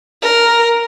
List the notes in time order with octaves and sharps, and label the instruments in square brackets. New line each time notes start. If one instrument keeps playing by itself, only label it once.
[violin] A#4